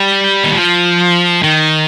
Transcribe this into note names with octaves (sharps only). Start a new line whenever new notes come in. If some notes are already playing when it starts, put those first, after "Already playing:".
Already playing: G3
D#3
F3
D#3